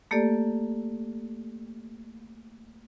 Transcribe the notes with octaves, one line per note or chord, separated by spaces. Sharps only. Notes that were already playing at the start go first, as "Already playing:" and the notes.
A3 A#3 G4 A4 D5